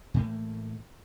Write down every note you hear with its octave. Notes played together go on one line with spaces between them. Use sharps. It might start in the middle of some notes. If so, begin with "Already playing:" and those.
A2 E3 A3 A#3